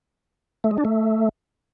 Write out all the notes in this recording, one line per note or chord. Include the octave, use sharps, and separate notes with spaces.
A3
G#3
D4
A3